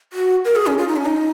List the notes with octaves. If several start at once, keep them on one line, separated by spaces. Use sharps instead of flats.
F#4
A#4
G#4
C#4
F4
D#4
C#4
D#4